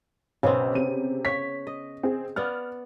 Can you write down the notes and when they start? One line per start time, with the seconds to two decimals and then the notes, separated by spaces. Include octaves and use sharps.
0.43 B1 C#3 B3 C4
0.75 C3 D#7
1.25 C#5 B6
1.67 D#5
2.03 C4 G#4
2.36 B3 D5 F#5 F6